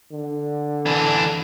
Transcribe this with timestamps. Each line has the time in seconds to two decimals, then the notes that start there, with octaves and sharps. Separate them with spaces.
0.12 D3
0.86 E3 D4